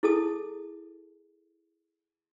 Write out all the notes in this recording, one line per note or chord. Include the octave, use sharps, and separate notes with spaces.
E4 G#4 A4 A5 D#6